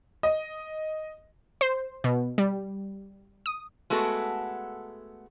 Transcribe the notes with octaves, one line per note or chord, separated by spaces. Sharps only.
D#5
C5
B2
G3
D#6
G#3 A3 B3 F#4 A4